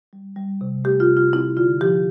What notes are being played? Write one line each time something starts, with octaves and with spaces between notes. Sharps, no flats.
G3
G3
C3
A3 G4
F4
C3
F4
C4 E4
D3 F4
F3 G4